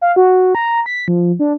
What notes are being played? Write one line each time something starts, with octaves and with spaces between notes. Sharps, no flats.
F5
F#4
A#5
B6
F3
D4